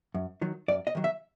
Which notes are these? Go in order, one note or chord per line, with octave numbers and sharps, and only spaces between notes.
F#2
D#3 F#3
F#2 D5
D#5
D#3 F#3
E5